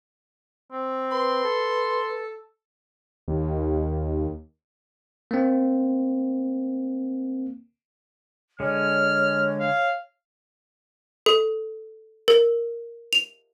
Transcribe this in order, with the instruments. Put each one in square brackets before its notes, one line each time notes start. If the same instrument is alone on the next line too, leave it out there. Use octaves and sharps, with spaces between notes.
[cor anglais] C4
[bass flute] B4 [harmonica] C6
[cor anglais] A4
[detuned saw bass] D#2
[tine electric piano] A#3 C4
[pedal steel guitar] D3 G#3 [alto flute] C#5 [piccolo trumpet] F6
[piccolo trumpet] F5
[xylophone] A4
A#4
F7